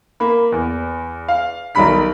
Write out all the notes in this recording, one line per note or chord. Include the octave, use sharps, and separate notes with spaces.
A#3 B5
E2
F5
B1 D#3 G3 A#5 B5 B6